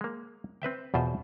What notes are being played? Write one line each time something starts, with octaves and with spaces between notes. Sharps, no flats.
G#3 A#3
C4 B4 E5 G5
E2 B2 F4 C5